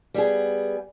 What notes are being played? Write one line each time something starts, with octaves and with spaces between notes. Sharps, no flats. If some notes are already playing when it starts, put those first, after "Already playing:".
G3 B3 G#4